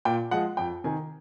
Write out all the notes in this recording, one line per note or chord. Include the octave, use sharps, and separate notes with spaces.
A#2 G5
F3 G#3 F#5
F2 G5
C3 D#3 G#5